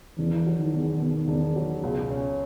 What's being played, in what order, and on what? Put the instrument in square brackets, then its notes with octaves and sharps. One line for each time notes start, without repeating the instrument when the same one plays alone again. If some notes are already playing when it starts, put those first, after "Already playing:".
[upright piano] E1 [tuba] E3
[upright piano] F#3
[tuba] D#3
[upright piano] E2
B2
E1
F#3
[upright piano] C#2 [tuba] B2
[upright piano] C#4